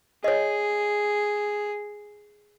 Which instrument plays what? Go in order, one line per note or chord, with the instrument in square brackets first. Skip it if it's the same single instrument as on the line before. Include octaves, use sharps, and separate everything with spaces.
[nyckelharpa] G#4 [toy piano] C#5 D#5